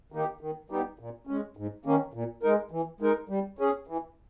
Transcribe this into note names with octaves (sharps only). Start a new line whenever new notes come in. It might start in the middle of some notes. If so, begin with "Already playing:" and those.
D#3 A#3 D#4 G4
D#3
G3 B3 D#4 G4
A#2
G#3 C#4
G#2
D#3 A#3 C#4
A#2
G#3 D#4 A#4
E3
G#3 D#4 A#4
G3
C#4 G#4
E3